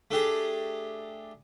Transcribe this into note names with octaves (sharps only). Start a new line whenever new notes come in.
A3 D4 G4 G#4